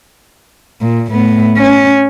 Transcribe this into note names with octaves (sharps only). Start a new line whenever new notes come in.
A#2
A2 B3
C#4